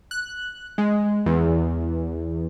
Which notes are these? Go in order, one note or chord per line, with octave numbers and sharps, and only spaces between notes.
F#6
G#3
E2